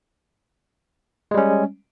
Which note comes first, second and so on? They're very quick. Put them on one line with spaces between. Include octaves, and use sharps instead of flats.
G#3 G3 C#4